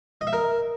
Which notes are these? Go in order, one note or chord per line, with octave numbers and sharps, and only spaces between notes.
D#5
E5
A#4